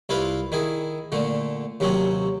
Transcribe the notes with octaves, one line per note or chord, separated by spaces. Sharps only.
C2 E4 F4 B4 F5
D#3 E4 G#4
A#2 D3 A3
D#2 C3 F#3 C4 C#4